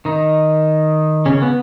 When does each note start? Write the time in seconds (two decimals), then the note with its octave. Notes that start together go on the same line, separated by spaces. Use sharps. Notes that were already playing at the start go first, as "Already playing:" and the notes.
0.05 D#3 D#4
1.26 C#3 C#4
1.42 B3